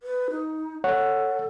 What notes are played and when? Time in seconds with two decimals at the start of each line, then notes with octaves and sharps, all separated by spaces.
0.03 B4
0.31 D#4
0.84 A4 C#5 F#5